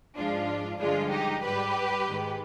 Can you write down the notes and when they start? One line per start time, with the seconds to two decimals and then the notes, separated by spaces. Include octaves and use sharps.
0.17 G#2 F3 G#3 D4 F4
0.80 G2 D3 F3 G#3 D4 F4
1.11 D#4 G4
1.42 G#2 G3 G4 B4
2.06 G#2 D#3 G#3